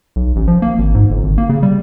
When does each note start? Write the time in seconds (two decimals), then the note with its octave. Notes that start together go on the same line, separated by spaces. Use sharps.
0.16 B1
0.36 A1
0.48 F3
0.62 A#3
0.79 G#1
0.95 G#2
1.11 G1
1.23 G#1
1.38 A#3
1.49 C#3
1.63 G3